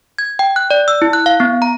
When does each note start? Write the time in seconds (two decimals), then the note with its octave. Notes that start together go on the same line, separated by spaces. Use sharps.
0.18 G#6
0.39 G5
0.56 F#6
0.71 D5
0.88 E6
1.02 E4
1.13 F#6
1.26 F5
1.40 B3
1.62 A#5